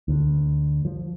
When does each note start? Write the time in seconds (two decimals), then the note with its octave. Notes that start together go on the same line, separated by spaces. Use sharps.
0.08 D2
0.85 F3